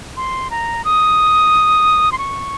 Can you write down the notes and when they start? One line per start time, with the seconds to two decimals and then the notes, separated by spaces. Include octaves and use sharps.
0.17 C6
0.51 A#5
0.85 D#6
2.12 C6
2.18 C#6